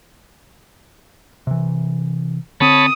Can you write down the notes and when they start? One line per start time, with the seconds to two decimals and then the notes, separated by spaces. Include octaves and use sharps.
1.47 C3 E3
2.60 D3 C4 C#5 A5 B5 D#6